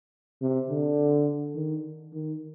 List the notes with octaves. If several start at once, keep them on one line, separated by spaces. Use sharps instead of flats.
C3
D3
D#3
D#3